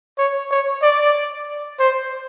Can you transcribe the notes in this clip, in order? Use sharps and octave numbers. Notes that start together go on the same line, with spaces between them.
C#5
C#5
D5
C5